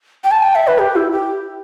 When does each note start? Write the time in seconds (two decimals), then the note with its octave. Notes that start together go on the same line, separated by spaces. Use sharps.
0.24 G5
0.31 A5
0.43 G5
0.55 E5
0.67 B4
0.79 G4
0.96 E4
1.11 G4